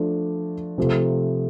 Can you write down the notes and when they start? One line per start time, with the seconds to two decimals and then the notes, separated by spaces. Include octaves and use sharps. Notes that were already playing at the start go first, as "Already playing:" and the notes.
Already playing: F3 A3 D4
0.78 C3 F3 A3